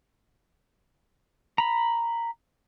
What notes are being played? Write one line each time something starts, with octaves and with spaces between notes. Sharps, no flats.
A#5 B5